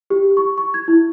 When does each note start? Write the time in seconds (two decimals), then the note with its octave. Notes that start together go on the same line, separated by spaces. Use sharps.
0.10 G4
0.37 C#6
0.58 C#6
0.74 G#6
0.88 E4